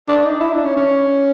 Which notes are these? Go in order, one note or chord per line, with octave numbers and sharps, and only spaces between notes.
D4
D#4
E4
D4
C#4
C#4